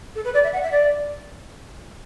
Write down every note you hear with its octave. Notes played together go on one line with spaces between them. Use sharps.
A4
B4
D5
E5
F#5
E5
D5